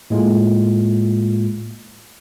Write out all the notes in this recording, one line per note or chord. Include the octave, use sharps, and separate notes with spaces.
A2 G#3 A#3 F4